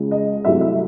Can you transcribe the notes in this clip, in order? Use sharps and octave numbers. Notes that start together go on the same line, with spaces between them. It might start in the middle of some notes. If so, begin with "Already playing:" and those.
Already playing: C#2 C#3 G#3
D#5
C2 C3 F#3 A3 E5
E5